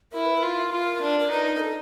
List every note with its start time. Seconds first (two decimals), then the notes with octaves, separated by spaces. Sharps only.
0.12 E4 A#4
0.25 B4
0.38 F4 A#4
0.72 F4
1.02 D4
1.20 A#4
1.31 D#4 B4
1.45 B4
1.55 A#4
1.60 A4